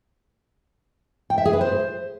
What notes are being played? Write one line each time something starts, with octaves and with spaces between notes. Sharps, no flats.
G5
E5
G#4
B4
C5